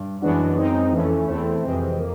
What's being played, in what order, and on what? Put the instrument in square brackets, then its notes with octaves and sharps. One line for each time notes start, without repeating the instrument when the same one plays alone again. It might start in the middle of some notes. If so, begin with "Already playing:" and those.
Already playing: [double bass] G2
[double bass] F#2 [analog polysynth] E3 G#3 B3 D4 F#4
[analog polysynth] G#3 C4 D#4
[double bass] F2 [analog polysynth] E3 A3 C#4
[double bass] E2 [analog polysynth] A3 C4 E4
[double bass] F2 [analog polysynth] C3 E3 G#3 C4
[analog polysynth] A#3